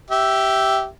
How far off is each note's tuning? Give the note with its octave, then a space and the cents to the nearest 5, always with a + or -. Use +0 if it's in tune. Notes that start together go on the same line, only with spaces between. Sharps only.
G4 -10 E5 +0